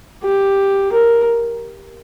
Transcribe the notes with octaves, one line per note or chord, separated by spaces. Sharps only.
G4
A#4